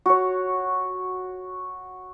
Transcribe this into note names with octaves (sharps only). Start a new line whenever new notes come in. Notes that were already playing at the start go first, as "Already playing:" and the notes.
F#4 C#5